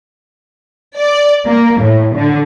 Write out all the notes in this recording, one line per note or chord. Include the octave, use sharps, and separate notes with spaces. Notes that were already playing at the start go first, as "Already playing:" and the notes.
D5
A#3
A2
D3